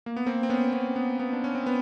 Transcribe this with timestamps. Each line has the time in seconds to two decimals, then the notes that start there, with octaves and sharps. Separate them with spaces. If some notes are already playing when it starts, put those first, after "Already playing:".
0.06 A#3
0.16 B3
0.26 A#3 C4
0.43 C4
0.50 B3 C#4
0.73 B3 C#4
0.96 B3
1.20 B3
1.33 D4
1.44 C#4
1.55 C4
1.66 B3